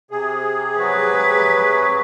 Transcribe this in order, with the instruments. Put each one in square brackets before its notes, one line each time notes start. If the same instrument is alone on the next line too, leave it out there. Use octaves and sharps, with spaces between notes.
[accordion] C3 G#4
[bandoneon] F#3 F#4 [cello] B4